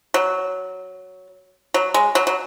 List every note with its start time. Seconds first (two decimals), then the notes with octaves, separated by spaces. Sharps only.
0.14 F#3
1.74 F#3
1.94 G#3
2.15 F#3
2.27 F#3